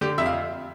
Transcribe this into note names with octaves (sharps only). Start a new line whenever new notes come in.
D3 G4
F2 E5
F5